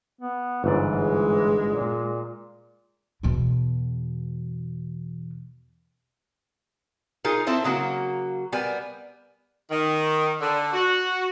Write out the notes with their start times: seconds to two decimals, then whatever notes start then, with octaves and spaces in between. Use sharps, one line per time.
0.21 B3
0.64 G1 G#2 E3 D5
0.96 G#3
1.69 A#2
3.23 E2 B2
7.24 D#4 F4 G#4 A#4
7.47 C4 E4 A4 C5
7.64 C#3 F#3 A#3 F#4
8.52 G3 B3 A#4 G#5
9.70 D#3
10.41 D3
10.73 F#4